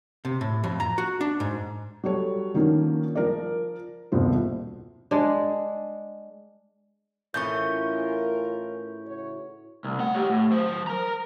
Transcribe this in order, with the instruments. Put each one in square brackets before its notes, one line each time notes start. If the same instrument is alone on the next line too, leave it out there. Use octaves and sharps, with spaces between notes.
[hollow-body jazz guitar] C3
A2
F2
A#5
F#4
D4
G#2
[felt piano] F#3 G3 A4 C#5
D3 D#3 F3 A#3 C#4
F3 A#4 D5
D#1 C2 B2 F3 C5
[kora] G#3 D4
[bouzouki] A2 E3 C#4 [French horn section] F4 A#4 [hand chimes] C#6 G6
[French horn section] C#3 F#4 C#5
[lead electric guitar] C2
A3 F#5
G4 C#5
A2
F#3 C5
A#4 A#5